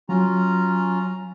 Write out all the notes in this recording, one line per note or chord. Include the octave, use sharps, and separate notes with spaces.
F#3 C#4 F4 A#5